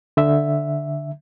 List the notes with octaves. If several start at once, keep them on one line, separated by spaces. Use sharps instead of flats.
D3 E5